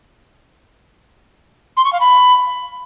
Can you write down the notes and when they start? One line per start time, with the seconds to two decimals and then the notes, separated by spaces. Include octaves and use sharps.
1.77 C6
1.85 C#6
1.93 F5
2.00 B5